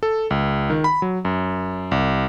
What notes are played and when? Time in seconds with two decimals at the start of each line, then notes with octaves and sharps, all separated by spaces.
0.03 A4
0.30 C#2
0.70 D#3
0.84 B5
1.02 F#3
1.25 F#2
1.92 C2